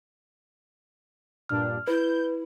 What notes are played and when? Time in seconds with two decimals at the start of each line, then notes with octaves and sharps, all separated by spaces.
1.49 G2 A#2 D4 F6
1.87 E4 B4 G6